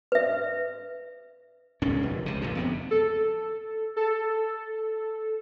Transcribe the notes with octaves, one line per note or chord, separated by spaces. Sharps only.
B4 E5
E1 C#2 G2 C#4
F1
C#2 C3
F1 A#2 D3
F2 C3 B3
A4
A4